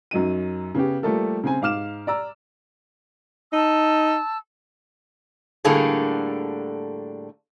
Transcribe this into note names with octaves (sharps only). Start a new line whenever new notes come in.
F#2 F#3 D#4 D#7
C#3 B3 C#4 G4
F3 G3 A3 A#3 A4 A#4
C#3 C4 G#5
G#2 F5 D6 F6 E7
D5 A#5 E6
D#4 A5 E6
A2 D3 G3 A#3 G#4 A4